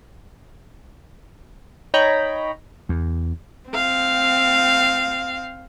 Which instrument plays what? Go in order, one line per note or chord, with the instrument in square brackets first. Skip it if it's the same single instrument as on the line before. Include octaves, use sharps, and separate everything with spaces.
[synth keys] D#4 C#5 D#5 G5 A#5 B5
[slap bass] E2
[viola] C4 F5